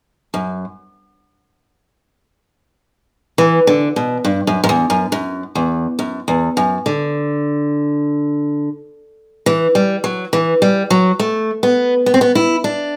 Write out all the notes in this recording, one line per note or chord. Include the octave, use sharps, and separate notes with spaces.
F#2
E3
D3
B2
G2
F#2
F#2
E2
F#2
F#2
E2
F#2
E2
F#2
D3
E3
G3
F#3
E3
G3
F#3
A3
B3
B3
C4
B3
E4
D4